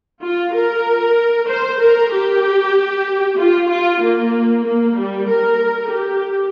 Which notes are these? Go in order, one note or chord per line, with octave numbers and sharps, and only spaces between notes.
F4
A#4
C5
A#4
G4
F4
F4
A#3
A#3
G3
A#4
G4